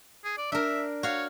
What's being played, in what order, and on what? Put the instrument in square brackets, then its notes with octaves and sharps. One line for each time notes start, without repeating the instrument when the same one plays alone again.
[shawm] G#4
D5
[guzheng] D4 A#4 [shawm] E5
[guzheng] F#4 F5 [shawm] C#5